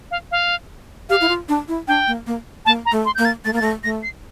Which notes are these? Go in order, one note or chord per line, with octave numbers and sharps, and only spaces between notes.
F5
F5
G4 F5
E4
F4
D4
E4
D4 G5
A#3
A#3
A#3 A5
A#5
A3
C6
A#3 G6
A6
A3 A6
A#3
A6
A3
A#6
A3 A#6
C7